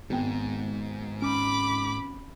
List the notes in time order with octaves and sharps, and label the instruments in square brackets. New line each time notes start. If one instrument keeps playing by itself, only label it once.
[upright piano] G#1 B3 G5 [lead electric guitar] G#2
[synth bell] C#4 [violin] B5 D6